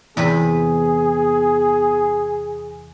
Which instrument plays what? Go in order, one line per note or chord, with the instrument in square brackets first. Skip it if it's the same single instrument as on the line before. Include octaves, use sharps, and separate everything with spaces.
[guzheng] E2 C3 B4 [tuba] B3 [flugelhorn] G#4